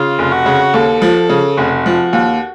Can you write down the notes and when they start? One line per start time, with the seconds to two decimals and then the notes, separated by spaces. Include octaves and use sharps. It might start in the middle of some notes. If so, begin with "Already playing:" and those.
Already playing: C#3 F4
0.19 F1
0.32 F#4
0.46 C#3
0.74 D#2 A4
1.02 F3
1.29 C#3
1.57 F1 F#4
1.86 F3
2.13 D#2